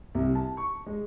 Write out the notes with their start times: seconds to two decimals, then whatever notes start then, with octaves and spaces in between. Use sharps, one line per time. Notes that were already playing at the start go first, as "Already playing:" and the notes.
0.15 C2
0.35 A5
0.57 C#6
0.86 G#3